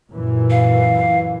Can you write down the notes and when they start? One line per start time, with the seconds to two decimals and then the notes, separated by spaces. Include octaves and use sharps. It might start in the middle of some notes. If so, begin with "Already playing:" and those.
0.11 F#2 A#2 E3
0.50 F5